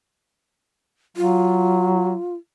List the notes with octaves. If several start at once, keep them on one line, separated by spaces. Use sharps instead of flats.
F#3 F4